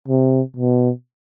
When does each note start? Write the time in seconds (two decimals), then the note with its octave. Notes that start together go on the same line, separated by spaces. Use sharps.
0.08 C3
0.57 B2